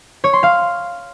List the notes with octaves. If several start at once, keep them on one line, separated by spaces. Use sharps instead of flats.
C#5
C6
F5